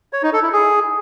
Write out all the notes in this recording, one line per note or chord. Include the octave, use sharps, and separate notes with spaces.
C#5
D#4
A4
E4
G#4